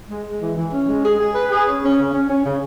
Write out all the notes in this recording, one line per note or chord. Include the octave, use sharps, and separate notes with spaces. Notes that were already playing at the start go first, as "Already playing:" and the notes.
G#3
G#3
E3
E3
C#4
G#3
G#4
G#4
B4
G#4
C#4
C#4
C#3
C#4
C#4
C#3